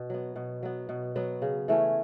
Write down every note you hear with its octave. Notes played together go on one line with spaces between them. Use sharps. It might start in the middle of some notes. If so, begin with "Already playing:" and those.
Already playing: B2
F#3 B3
B2
F#3 B3
B2
F#3 B3
C#3
E3 A3 C#4